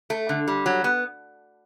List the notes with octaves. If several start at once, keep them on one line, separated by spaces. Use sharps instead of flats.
A3
D3
G3
F#3
B3